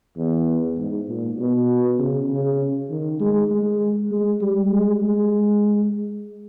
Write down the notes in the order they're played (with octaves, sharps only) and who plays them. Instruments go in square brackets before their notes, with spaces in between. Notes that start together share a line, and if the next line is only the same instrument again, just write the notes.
[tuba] E2
G#2
A#2
B2
C#3
C#3
D#3
G#3
G#3
G#3
G3
G#3
G#3